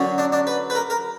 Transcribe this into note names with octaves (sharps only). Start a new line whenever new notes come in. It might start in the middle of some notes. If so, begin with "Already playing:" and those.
Already playing: F#2 D3 F#3
D4
D4
B4
B4
A#4
A#4